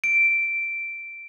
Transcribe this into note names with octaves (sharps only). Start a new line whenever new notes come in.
D7